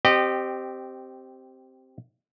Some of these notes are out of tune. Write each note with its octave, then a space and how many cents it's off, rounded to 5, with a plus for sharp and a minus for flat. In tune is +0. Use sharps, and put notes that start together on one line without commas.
C4 +0 G4 -10 D#5 -30